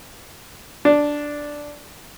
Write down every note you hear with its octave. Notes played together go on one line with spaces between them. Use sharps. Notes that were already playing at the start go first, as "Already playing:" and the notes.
D4